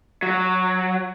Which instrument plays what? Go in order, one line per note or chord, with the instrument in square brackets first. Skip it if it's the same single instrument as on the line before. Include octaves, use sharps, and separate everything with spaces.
[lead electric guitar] F#3